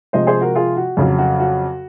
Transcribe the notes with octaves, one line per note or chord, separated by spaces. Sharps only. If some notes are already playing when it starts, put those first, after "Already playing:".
C3 F3 G#3 C5 D#5
G#4 C5
F#4 A#4
F4 G#4
F#4
F2 C#3 F#3
F#4
F#4